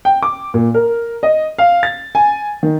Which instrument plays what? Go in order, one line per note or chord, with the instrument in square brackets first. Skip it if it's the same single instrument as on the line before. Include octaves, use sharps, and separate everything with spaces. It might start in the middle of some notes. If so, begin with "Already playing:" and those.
[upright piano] G5
D6
A#2
A#4
D#5
F5
A6
G#5
D#3